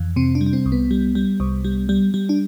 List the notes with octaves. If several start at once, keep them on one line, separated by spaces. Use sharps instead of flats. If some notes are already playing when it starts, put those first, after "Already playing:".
Already playing: F2 E3
C3 C4
D4
G3
D4
C4
C2
B3
G3
G3
C2
G3
G3
G3
D4